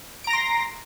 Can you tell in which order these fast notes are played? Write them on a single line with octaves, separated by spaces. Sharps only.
D7 A#5 A#6 C6